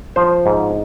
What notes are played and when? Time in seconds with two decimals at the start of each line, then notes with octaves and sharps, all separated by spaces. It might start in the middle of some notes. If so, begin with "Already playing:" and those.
0.16 F3 C5
0.46 G#2